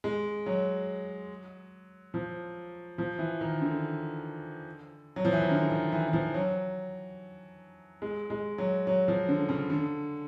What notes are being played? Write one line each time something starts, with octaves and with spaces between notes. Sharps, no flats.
G#3
F#3
F3
F3
E3
D#3
D3
F#3
F3
E3
D#3
D3
D#3
E3
E3
F3
F#3
G#3
G#3
F#3
F#3
F3
D3
C#3
D3